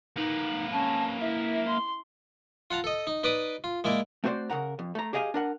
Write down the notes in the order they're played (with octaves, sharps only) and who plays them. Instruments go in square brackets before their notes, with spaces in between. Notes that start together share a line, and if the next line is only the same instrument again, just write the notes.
[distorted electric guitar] A#3 B4 [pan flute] D#4
[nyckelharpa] C#4 [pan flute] A5
[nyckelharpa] E4 [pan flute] E5
[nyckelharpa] C6
[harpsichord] F4 F#5 A5 A#5
A4 D#5
D#4
D#4 B4 D5 B5 D6 D#6
F4
G#3 A#3 E4 D5
[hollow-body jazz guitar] A3 C4 F#4 B4 C5 D5
C#3 A#4 F#5 A#5
F2
A3 A#5
G4 G#4 D#5 F5 F#5 G#5
D4 A#4 F#5